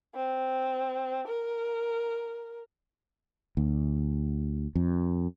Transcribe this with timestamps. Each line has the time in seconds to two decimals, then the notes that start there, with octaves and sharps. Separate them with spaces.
0.15 C4
1.28 A#4
3.57 D2
4.75 F2